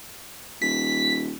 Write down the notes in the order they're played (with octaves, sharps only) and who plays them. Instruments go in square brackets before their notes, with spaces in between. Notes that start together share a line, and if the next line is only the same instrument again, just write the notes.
[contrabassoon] D#1 [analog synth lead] B6